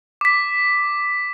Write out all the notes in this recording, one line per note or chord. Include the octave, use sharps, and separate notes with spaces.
D6 B6